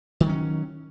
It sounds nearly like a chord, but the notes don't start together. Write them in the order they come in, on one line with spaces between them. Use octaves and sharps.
D#3 G3 F#3 C#4